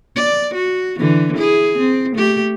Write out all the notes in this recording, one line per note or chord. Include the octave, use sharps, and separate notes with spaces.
D5
F#4
D3 E3
E4 G#4
C4
A3 G4